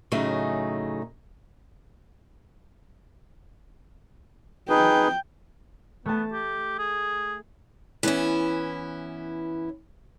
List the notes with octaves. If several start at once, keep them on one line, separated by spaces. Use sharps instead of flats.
A2 C#3 F#3 A3 D#4 G#4
D#4 G#4 B4 G5
A3 B3 A5
G4
G#4
E3 B3 C#4 E4